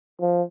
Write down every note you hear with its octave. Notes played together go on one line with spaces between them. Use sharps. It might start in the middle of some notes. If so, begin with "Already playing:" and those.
F3